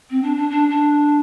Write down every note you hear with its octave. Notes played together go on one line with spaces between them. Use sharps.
C4
D4
D4
D4
D4